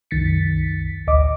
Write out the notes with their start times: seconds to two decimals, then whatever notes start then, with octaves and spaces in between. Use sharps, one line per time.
0.11 C2 F#2 D#3 A6 B6 C#7
1.07 A1 D2 D#5 D6